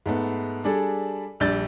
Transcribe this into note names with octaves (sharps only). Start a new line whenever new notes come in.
G#2 A3 B3
G3 D4 G#4 A4
A#1 G3 D4 E6 G6 A6